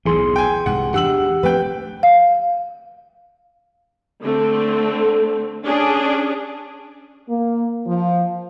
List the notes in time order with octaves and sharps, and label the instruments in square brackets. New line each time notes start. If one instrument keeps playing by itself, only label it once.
[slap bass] B1 E2 A2 [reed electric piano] E3 G#4 C6
[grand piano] G5 G#5
[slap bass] C2 G#2 C3 [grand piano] F#5
[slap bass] E2 D4 [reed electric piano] G4 [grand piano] F#5 E6 F#7
[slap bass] F3 A3 C4 [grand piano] B4 G5
[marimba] F5
[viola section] D3 A3 C4
C#4 D4 G#4
[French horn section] A#3
F3